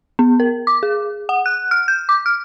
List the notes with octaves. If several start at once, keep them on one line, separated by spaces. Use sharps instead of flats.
B3
A#4
D6
G#4
F#5
F#6
F6
G6
D6
F6